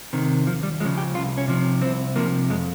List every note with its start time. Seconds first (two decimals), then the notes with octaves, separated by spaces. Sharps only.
0.13 C3 D#3
0.47 D#2 F3
0.63 G3
0.80 C#3 F3 G#3
0.98 G4
1.14 C2 F4
1.38 C#4
1.48 C3 F3
1.81 C2 C4
2.16 C3 F3 A#3
2.49 F2 G#3